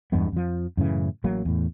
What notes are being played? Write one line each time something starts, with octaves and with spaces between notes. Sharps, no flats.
E2 G2 G#3 B3
F2 F3
F#2 A2 C#3 E3
A1 F#3 A#3
E2 A2